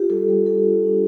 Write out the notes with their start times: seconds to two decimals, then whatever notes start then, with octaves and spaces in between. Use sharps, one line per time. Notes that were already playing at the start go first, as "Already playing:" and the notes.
Already playing: F4 G4
0.10 G3 A4
0.29 G3 A4
0.46 D4 A4
0.65 F4
0.84 D4